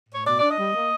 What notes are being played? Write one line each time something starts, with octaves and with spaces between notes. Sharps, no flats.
A2 C#5
B2 D5
D4 D5
D#5
G3
A#3